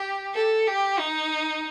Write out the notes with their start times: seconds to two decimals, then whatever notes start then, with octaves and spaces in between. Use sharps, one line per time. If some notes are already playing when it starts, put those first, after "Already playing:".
Already playing: G4
0.34 A4
0.67 G4
0.99 D#4